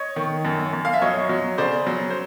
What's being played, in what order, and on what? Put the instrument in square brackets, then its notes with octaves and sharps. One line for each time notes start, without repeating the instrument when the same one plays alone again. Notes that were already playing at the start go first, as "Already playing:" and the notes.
Already playing: [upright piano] C#5 D#5
D#3
F#2
F#2
F5
E5
F#3 C#5 D#5
F#3
C#3 C5 D5
F#3
C5